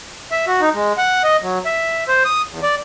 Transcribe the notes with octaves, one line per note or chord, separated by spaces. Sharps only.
E5
F#4
D#4
G#3
F#5
D#5
F#3
E5
C5
D#6
E2
D5